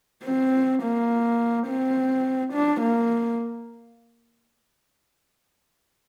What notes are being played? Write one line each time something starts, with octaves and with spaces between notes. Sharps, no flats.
C4
A#3
C4
D4
A#3